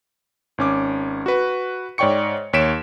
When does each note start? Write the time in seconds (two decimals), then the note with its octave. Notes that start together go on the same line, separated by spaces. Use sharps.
0.58 G#1 C#4 D6
1.26 F#4 B4
1.98 G#2 C#5 D5 G5 C#6 C#7
2.53 D#2 C#5 B6 D7 E7